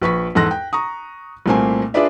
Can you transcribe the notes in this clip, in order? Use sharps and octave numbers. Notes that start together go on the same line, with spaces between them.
A#1 B4 C#6 B6
E2 G#2 A4 C6 F#6 A#6
G5
A#5 C#6 D#6
C2 A#2 A3 A#3 C4 G#5
D4 F4 G#4 B4 D5 E5